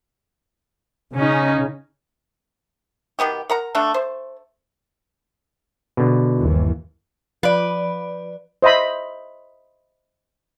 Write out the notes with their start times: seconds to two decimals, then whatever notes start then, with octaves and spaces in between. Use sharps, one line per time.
1.14 C#3 C#4 D#4
3.19 B2 D#3 B3 G4
3.50 A#4 F#5 A#5
3.75 D3 A3 D4
3.94 C5
5.97 B2 D3
6.37 G1 D#2 E3
7.43 F3 B4 D5
8.62 C5 D#5 E5 B5